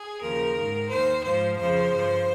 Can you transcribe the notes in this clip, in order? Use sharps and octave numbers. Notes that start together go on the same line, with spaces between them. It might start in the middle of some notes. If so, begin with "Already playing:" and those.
Already playing: G#4
D#2 C#3 F3 A#4
G#2 D#3
D#2 D#3 C5
G#2 F3 C5
F2 C#3 F3 C5
G2 F3